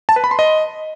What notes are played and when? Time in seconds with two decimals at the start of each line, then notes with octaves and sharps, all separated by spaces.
0.09 A5
0.16 B4
0.24 B5
0.31 C6
0.39 D#5